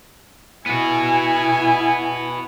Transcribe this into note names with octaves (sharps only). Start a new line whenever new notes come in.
B3 E4 F#4 G#5